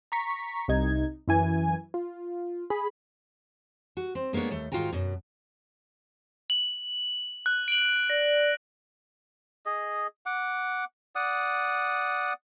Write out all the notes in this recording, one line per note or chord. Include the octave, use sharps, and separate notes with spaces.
A#5 C#6 B6
C2 C3 D#4 G#6
F#2 E3 G#5
F4
G#4 B5
F#4
C4
G#3 A#3 B3 D4 C#5
D#2 A3
G#2 D#3 F4 F#4 G5 A#5
F#2 B2
F#7
F#6
D7 F#7
D5 A#6
G#4 D#5
F#5 D6
D5 F#5 D#6